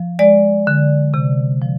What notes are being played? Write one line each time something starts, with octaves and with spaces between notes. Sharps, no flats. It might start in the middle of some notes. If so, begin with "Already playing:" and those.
Already playing: F3
G#3 D5
D3
C3
F3